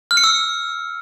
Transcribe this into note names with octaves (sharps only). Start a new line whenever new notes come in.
F6
C#7
E6